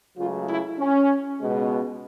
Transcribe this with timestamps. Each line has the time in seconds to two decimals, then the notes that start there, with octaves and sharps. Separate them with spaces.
0.17 C#2 C#3 F#3 A3 F4
0.48 E4
0.78 C#4
1.39 C#2 B2 G#3